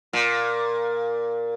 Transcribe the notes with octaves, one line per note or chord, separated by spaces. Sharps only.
A#2